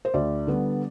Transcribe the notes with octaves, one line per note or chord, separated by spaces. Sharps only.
C5
D2 D5
D3 G3 B3